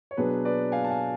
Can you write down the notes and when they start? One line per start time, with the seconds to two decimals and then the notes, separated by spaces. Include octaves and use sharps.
0.11 C#5
0.17 B2 F#3 B3 D4 G#4 B4
0.45 B4 D5
0.72 F5 G#5
0.84 A5
0.90 F5 G#5